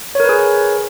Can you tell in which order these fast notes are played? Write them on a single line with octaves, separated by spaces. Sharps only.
C#5 A#4 B4 G#4